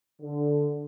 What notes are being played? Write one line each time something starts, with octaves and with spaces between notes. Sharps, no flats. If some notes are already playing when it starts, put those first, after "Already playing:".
D3